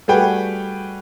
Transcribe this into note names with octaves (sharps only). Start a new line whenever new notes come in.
G3 A3 F#4 G#4 B4 G5